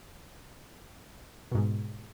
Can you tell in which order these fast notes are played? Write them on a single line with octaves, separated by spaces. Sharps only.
B2 G#2 G#3